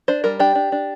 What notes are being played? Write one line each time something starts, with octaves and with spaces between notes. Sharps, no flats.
D4 C5
G3 A#4
D4 G4
D4
D4